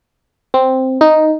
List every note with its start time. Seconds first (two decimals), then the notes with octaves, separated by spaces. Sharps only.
0.54 C4
1.01 D#4